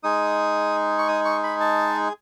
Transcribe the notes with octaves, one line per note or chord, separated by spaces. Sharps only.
G#3 D#4 G#4 D#6
C#6
D#6
C#6
B5
A5